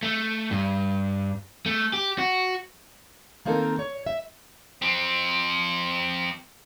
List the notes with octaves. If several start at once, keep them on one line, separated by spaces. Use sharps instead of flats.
A3
G2
A3
G4
F#4
D#3 A#3 C4 D#4 A4 A#4
C#5
E5
F3 C4